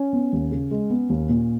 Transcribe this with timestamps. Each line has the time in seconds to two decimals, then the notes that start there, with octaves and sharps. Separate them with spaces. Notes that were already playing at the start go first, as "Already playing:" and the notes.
Already playing: C#4
0.13 B3
0.33 D#2
0.52 C#3
0.71 G#3
0.90 B3
1.10 D#2
1.29 A#2